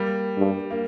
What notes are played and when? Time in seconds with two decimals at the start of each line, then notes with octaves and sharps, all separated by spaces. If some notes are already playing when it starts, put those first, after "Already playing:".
Already playing: G3 A#3
0.37 G2
0.70 A#3